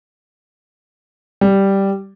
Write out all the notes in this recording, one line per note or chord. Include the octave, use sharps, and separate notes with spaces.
G3